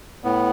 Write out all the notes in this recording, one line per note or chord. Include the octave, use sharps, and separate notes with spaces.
A2 B3